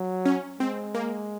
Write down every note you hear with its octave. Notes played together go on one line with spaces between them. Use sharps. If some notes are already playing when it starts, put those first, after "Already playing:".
Already playing: F#3
C#4
G#3 C4
A#3